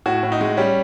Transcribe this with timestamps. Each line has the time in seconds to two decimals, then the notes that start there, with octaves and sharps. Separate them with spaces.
0.06 A2 F#4
0.23 A2
0.32 D#4
0.41 G#3
0.57 G3 C#4